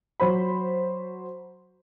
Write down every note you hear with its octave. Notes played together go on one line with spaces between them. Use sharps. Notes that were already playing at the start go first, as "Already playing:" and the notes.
F#3 C5 B5